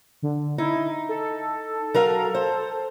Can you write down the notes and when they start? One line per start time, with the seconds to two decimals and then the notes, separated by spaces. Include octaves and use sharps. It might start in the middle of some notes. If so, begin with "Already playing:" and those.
0.22 D3
0.58 D#4 E4
1.09 A4
1.94 F#3 A#4 F5
2.35 C5